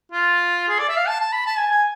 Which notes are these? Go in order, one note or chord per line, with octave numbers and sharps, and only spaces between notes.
F4
G#4
D5
E5
F5
A5
A5
B5
A5
G#5
G#5